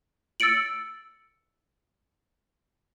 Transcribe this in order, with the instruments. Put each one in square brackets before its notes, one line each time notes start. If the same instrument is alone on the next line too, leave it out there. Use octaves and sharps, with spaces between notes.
[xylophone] E6 A6 C#7 D7 F#7